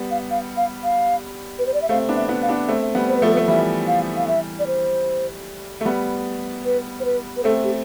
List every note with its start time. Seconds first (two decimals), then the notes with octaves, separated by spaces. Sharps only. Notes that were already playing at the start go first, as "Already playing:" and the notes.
Already playing: G3 B3
0.11 F5
0.31 F5
0.57 F5
0.84 F5
1.59 B4
1.67 C5
1.74 D5
1.82 E5
1.89 A3 C4 F5
2.09 B3 D4
2.16 E5
2.29 B3 D4
2.42 F5
2.49 B3 D4
2.68 A3 C4 E5
2.95 G3 B3
3.08 C5
3.17 B4
3.22 F3 A3 A4
3.34 B4
3.37 A3
3.48 E3 G3 E5
3.87 F5
4.16 F5
4.27 E5
4.59 D5
4.67 C5
5.81 A3
5.85 G3 B3
6.65 B4
7.00 C5
7.05 B4
7.37 B4
7.44 A3 C4 A4
7.64 G4